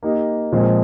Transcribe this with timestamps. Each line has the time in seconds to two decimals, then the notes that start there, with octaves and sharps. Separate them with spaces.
0.03 A#3 D#4 G4
0.52 A#2 F3 G#3 C4